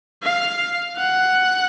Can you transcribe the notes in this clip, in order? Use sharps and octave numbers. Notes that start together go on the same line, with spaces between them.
F5
F#5